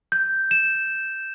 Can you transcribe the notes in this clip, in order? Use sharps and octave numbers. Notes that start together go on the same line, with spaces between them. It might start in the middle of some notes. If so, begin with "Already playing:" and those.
G6
E7